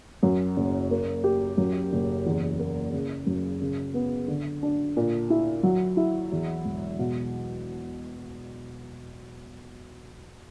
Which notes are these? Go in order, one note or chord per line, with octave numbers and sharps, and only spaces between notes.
F#2
F#1
A#3
G4
F#2
F#1
E2
A#3
C#3
F#2
C#3
B3
D3
D4
A#2
E4
F#3
E4
E2
E1
B2